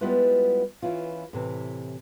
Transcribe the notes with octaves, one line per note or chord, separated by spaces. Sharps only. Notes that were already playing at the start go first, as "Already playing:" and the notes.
G3 G#3 B3 E4 F4 B4
E3 C#4 E4 F4
A2 C3 E3